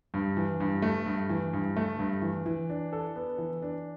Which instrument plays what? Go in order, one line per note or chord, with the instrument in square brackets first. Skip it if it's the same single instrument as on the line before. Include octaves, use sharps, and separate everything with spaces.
[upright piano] G2
E3
G2
A3
G2
E3
G2
A3
G2
E3
E3
D4
A4
B3
E3
D4